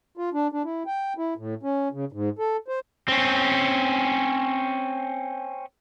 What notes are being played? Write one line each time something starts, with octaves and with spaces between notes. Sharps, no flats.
F4
D4
D4
E4
G5
E4
A2
C#4
C#3
G#2
A4
C5
C4 C#4